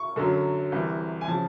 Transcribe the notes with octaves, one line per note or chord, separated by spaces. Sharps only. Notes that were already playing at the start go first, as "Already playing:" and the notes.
Already playing: C#6
F#2 D3 F#3
C2 C3 E3
G#5
C#3 F3 A5